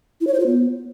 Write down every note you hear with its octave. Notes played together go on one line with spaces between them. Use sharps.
E4
C#5
C5
F4
B3